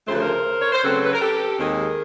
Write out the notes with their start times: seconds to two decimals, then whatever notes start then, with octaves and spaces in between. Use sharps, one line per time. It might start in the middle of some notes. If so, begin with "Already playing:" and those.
0.06 D2 C#3 F3 A3 C5
0.13 B4
0.20 A#4 C5
0.62 C#5
0.73 C5
0.83 C#3 F#3 A3 C4 A4 B4
1.05 B4
1.13 A#4
1.21 G4 A4
1.59 D#2 D#3 G#3 C4 G#4 A#4